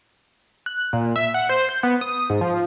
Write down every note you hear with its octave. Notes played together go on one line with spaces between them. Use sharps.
F#6
A#2
E5
F#5
C5
G6
B3
D#6
G#2
F3